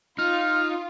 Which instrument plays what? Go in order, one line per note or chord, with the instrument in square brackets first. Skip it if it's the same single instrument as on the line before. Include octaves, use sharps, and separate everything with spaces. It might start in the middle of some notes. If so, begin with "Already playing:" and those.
[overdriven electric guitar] D#4 [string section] F4 [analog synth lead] F6